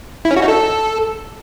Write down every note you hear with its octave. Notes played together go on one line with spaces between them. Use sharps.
E4
C#4
F#4
D#4
A4